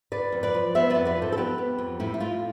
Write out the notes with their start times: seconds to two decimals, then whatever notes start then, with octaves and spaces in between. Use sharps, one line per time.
0.12 D3 B4 D5
0.32 F2
0.43 B4 D5
0.54 F3
0.75 B3 C5 E5
0.90 F2 B4 D5
1.05 B4 D5
1.16 F3
1.22 A4 C5
1.32 A4
1.37 B3 G4 B4
1.58 B3
1.79 F2
2.00 A2 E4 G4
2.14 E4
2.20 A2 F4